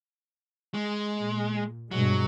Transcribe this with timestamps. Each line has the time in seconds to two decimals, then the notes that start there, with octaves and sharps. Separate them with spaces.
0.74 G#3
1.18 A#2
1.91 G2 B2 F#3 G#3